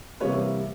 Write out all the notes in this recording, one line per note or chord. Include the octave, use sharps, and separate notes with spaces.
C3 E3 G3 A#3 B4 C#5